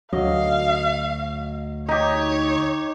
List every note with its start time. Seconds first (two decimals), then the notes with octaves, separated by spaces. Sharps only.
0.13 D2 F#3 D#5 F5
1.88 D#4 G4 C#5 D#5